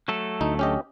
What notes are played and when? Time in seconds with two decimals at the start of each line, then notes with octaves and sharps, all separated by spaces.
0.08 F#3 A3 A4
0.41 D2 D#4
0.59 C#4 G4 D#5